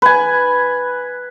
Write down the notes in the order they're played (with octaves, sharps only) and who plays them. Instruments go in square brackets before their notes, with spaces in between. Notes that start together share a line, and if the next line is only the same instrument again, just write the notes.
[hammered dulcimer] B4 G#5